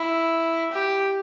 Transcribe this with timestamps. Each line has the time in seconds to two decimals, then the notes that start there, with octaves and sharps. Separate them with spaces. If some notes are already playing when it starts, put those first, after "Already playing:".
Already playing: E4
0.72 G4